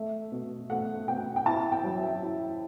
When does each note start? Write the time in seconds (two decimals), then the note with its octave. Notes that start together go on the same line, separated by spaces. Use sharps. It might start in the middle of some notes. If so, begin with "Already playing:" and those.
Already playing: A3 E5
0.32 B2
0.70 A3 F#5
1.08 B2 G5
1.36 G5
1.46 E4 A5
1.72 G5
1.84 F#3
1.97 E5
2.23 E4